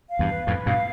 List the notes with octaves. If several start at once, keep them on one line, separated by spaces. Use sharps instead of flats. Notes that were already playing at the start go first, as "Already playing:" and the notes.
F5
E2 G2
B4
F2 A2 B4
G2 B2 F5